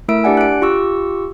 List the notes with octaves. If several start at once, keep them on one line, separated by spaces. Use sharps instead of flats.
A3 E4 A#4 E5 E6 D7
D4 G4 D5 F#5 G#5
F#6 D7
F4 G4 C#6 E6